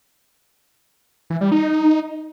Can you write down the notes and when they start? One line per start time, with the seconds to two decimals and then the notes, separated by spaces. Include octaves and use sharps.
1.30 E3
1.41 G3
1.52 D#4